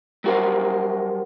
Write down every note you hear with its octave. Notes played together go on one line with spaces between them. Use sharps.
F#3 G3 F#4 A4 A#4 C5